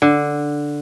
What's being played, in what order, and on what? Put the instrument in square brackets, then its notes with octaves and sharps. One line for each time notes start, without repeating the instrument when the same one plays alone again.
[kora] D3